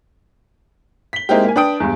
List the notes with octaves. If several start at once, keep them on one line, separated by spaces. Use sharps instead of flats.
B6 G7
G#3 A#3 C4 D#4 E4 G4
A#3 G#5
D4 B4 G5 D#6 D7
E2 G2